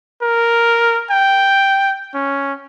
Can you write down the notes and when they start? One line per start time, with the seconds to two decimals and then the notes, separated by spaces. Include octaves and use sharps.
0.22 A#4
1.11 G5
2.15 C#4